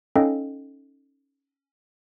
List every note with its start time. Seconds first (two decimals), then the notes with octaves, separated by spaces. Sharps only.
0.16 C#4 D#4 A4 D#5 F5 G5